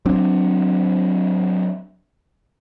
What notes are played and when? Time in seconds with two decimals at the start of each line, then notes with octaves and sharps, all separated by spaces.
0.06 F#3 C4 D4